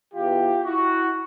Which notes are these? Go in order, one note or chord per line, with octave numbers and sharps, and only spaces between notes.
E2 B2 F4 G4
E4 F#4